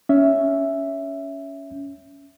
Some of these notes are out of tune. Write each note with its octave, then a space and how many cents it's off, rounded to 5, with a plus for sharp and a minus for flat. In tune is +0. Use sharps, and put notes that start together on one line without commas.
C#4 +15 E5 +0